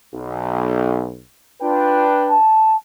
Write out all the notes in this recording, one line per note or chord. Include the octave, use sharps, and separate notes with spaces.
B1
D4 F4 B4 G5
A5